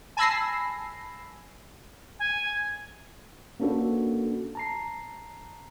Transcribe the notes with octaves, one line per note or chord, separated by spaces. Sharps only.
G#5 A5 B5 E6 A#6 C7
G#5
A#3 C#4 D4 F#4 A4 B4
A5 A#5 C7